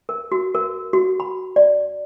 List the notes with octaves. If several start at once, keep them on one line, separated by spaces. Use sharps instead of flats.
A#4
F#4
A#4
F#4
B5
D5